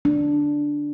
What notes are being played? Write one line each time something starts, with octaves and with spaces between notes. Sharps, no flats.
D4